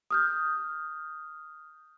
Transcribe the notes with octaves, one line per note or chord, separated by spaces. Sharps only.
D#6 F6 G6